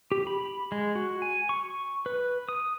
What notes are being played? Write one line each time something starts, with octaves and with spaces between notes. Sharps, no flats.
G4
B5
G#3
F#4
G#5
C#6
B4
D#6